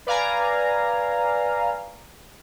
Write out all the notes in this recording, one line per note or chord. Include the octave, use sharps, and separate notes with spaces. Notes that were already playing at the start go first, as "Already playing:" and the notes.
B4 D5 F5 G#5 A#5